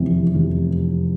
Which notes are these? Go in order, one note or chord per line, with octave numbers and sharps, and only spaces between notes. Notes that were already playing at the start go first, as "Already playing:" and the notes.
Already playing: F1 E2 C3
E3
F1